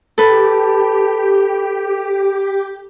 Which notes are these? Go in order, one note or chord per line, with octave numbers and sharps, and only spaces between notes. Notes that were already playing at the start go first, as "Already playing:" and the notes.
G4 A4 B4